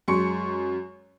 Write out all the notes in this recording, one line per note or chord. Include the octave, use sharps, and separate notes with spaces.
F#2 G#3 C6 C#6 C#7